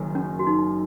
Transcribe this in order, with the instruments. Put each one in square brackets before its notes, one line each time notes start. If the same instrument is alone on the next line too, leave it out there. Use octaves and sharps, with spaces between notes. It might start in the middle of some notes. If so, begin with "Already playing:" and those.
Already playing: [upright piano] F#1 F#2 D#3
[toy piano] C#4
F#4
D#4